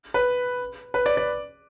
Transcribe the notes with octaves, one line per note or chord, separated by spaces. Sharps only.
B4
B4
D5
D5